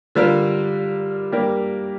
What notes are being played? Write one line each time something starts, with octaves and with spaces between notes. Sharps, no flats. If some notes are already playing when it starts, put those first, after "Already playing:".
D3 G3 D4 F4 A#4
G3 A#3 D4 G4 A#4